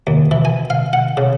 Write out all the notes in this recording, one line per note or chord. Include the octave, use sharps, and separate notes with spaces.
D#2
E3
G#5
F5
F#5
C#3